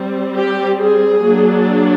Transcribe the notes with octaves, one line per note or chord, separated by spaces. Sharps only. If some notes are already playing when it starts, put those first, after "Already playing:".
Already playing: G3 C4
G4
G#4
F#3 A#3 D4